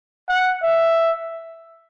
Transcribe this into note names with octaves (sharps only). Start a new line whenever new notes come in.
F#5
E5